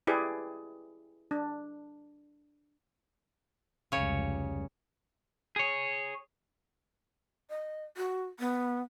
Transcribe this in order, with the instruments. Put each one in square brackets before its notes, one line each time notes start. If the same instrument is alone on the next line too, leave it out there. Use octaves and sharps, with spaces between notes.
[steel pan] E4 G4 G#4 B4 D5
D4
[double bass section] F1 C#2 G3 [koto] C#3 C#5
[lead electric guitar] G#4 C#5
[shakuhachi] D#5
F#4
B3